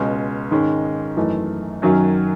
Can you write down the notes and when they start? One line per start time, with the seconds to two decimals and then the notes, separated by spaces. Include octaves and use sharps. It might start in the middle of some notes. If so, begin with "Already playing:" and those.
Already playing: C#2 B2 G#3 C#4
0.51 G#2 D#3 G#3 C#4
1.17 F#2 E3 A3 D#4
1.82 F#2 D#3 F#3 C#4